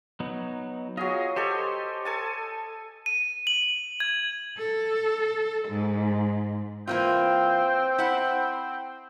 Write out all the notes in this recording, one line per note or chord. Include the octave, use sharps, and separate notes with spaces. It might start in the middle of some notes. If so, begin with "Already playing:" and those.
F#3 B3 D#4
F#3 F4 G#4 D#5
G4 A4 C5 C#5 D#5 G#5
A4 G#5 A5
D#7
F#7
G#6
A4
G#2
E3 A#3 C4 F4 G5
E4 F#5